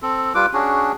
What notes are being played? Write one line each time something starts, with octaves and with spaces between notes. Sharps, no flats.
C4 A4
G3 F4 B4 D6
C#4 D4 F#4 G#4